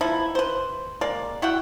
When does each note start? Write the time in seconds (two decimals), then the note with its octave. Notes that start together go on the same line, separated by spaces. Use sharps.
0.01 F3 B3 D#4 E4
0.35 B4 C5
1.01 G#3 A#3 D5
1.42 E4 F#4 F#5 G5